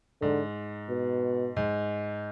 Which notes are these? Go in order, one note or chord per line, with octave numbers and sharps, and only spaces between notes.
G#2 D3
B2
G#2